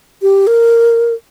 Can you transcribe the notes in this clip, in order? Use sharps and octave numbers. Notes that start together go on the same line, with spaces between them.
G4
A#4